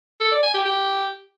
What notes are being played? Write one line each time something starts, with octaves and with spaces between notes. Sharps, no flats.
A4
D5
G#5
G4
G4